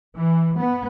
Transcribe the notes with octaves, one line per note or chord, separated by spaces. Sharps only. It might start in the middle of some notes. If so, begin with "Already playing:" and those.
E3
B3